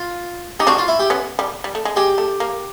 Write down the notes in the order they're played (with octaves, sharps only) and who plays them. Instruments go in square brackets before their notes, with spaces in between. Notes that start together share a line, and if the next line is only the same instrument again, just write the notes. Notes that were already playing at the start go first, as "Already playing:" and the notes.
Already playing: [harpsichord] F4
[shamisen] D#4 [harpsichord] G4
[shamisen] C4 D4 [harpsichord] F#4
[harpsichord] F4
E4
G4
[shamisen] B3 C#4
G3
G3
A3
G#3
[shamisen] G#3 [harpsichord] G4
[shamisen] A3
A#3